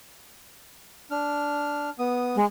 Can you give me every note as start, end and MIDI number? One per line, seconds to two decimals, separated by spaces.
1.11 1.90 62
1.11 1.90 89
1.99 2.37 59
1.99 2.37 87
2.36 2.45 56